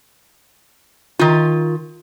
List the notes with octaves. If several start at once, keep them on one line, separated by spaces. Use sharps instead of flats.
D#3 F4